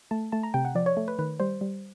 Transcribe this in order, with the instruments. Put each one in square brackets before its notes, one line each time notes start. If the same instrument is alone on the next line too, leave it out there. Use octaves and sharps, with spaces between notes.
[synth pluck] A3 A5
A3 A5
A#5
C3 G5
F#5
F3 D5
C#5
A3
B4
D#3 B4
G3 C5
G3